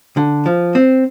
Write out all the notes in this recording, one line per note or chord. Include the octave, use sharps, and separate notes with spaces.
D3
F3
C4